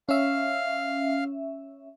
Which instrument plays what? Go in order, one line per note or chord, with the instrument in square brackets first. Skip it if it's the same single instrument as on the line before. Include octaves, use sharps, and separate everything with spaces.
[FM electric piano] C#4 E5 [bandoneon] F5 F6